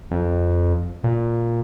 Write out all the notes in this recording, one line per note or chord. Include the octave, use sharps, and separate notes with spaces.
F2
A#2